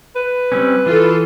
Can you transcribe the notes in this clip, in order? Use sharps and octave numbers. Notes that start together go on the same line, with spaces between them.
B4
G3 C4 C#4
E3 F4 A4